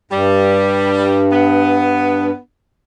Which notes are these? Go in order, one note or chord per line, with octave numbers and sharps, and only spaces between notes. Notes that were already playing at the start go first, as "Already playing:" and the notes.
G2 G3
B3